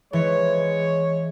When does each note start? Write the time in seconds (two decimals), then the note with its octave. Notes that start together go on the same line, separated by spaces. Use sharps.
0.13 E3 G#3 C#5